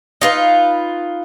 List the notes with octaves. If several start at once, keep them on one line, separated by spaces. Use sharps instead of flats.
D#4 F4 B4